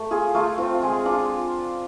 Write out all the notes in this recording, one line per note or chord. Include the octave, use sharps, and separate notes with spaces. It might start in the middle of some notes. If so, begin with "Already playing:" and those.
Already playing: A3
F4 G#4
A3 F4
C4 F4
G#3 G#4
D4 F4